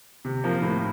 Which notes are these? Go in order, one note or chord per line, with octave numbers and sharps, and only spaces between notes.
C3
F3 A#3
A2